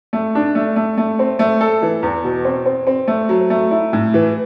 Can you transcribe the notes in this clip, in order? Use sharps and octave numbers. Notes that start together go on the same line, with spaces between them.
A3
D4
A3
A3
A3
C4
A3
A4
E3
E2
B2
C4
C4
C4
A3
F#3
A3
E4
A2
E3